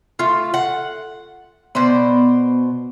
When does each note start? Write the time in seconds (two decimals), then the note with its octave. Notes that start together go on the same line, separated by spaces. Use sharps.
0.19 A3 F4
0.54 F#5
1.75 B2 B3 C5 D5